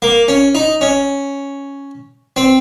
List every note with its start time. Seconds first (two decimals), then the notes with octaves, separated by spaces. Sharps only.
0.02 A#3
0.28 C#4
0.55 D#4
0.81 C#4
2.36 C4